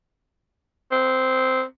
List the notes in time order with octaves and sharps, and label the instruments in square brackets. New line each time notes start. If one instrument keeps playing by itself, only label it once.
[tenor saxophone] C4